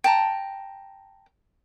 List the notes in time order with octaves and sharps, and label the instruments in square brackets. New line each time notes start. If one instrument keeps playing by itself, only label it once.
[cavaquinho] G5 A5 A#5